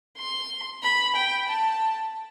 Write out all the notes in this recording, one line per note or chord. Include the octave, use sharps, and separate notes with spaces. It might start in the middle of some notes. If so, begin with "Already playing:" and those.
C6
B5
G5
A5